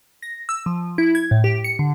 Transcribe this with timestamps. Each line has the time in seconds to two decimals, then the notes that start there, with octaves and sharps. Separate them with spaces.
0.22 A#6
0.49 E6
0.66 F3
0.98 E4
1.15 G#6
1.31 A2
1.44 G4
1.64 C#7
1.79 D3